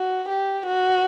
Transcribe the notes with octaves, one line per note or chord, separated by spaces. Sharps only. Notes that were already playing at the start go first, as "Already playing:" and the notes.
Already playing: F#4
G4
F#4